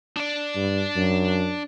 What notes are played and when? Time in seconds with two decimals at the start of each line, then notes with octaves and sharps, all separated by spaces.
0.17 D4 D5
0.55 G2
0.96 F#2